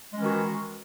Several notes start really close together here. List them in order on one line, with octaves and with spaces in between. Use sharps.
G#3 C#4 E3 D#3 F#4